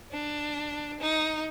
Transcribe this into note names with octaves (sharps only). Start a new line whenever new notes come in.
D4
D#4